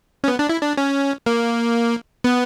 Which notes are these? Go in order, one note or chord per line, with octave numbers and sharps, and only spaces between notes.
C#4
B3
D4
E4
D4
C#4
A#3
B3